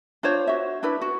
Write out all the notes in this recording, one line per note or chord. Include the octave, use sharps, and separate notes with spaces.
D4 F4 C5 C#5
F#4 E5
D4 E4 B4
F#4